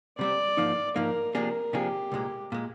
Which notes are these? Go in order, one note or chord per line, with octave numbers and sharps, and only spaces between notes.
C3 G3 C4 D5
G#2 F3 A#3 D#4
G#2 F3 A#3 D#4 A#4
C3 F3 A#3 D4 G#4 A#4
C3 F3 A#3 D4 G4 G#4
C2 A#2 G#3
A#2 G#3